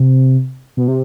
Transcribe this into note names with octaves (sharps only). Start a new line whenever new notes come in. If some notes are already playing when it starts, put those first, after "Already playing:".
Already playing: C3
B2
C3